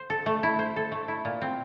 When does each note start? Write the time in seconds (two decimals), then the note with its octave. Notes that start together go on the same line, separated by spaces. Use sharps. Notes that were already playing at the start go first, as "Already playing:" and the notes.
Already playing: C5
0.10 A4
0.26 A3
0.43 E4
0.59 C5
0.76 A4
0.92 A3
1.08 E4
1.25 A#2
1.42 C4